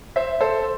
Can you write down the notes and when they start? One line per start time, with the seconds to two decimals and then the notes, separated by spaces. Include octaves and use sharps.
0.16 C5 E5
0.41 A4 C5